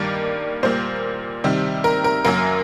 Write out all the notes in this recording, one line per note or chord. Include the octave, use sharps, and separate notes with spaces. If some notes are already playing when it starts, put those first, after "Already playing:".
Already playing: G2 D#3 G3 A#3 D5
A#2 G3 A#3 C5
C3 D#3 G3
A#4
A#4
F#2 F#3 A#3 A#4